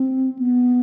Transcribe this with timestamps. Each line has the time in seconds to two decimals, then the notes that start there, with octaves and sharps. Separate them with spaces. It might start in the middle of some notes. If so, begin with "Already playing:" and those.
Already playing: C4
0.39 B3